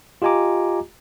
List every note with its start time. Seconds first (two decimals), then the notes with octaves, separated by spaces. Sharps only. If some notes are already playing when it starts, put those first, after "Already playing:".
0.22 F4 G4 D#5 G#5 A#5 D6